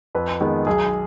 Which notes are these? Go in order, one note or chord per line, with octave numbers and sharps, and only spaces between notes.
F2 B4
D#3 G#3 B3
B1 G#4